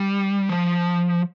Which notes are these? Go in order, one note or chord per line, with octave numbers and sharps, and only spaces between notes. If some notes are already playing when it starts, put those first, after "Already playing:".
Already playing: G3
F3